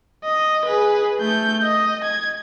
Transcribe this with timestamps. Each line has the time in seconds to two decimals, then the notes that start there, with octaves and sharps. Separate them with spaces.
0.24 D#5
0.66 G#4 B4
1.19 A3 G6
1.64 D#5
2.04 G#6